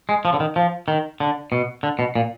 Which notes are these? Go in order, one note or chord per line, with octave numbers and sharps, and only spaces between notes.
G#3
F3
D3
D#3
F3
D#3
D3
B2
D3
B2
A#2